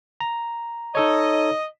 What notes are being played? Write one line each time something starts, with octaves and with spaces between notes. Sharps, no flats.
A#5
D#4 A4 C#5 D#5